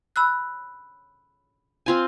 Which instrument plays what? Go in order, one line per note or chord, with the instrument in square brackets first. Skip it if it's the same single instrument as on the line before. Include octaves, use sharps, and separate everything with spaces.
[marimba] B5 E6 F#6
[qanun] C4 F4 G#5